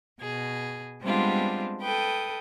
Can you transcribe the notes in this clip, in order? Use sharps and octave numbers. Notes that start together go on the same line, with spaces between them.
B2 G#4
G3 G#3 B3 C4 D4 F4
A4 B4 G5 D#6